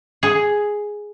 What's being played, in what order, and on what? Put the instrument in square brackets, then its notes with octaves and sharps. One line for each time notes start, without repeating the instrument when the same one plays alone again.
[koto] G#4